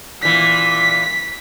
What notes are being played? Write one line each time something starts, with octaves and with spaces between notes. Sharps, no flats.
A#2 E3 B6